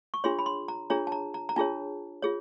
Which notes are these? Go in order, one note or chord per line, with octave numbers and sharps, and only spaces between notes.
C#6
D4 F4 G#4 C#5 C6
B5
C6
A#5
D4 F4 G#4 C#5 A#5
A5
A#5
A#5
A#5
D4 F4 G#4 C#5 A5
F4 G#4 C#5